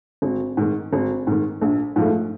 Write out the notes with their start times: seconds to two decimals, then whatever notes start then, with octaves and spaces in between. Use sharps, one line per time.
0.22 G#1
0.57 G#2 D#3
0.93 G#1
1.27 G#2 D#3
1.61 A#1
1.96 G#2 F3 A3